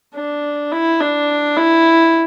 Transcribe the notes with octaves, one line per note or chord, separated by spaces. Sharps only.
D4
E4
D4
E4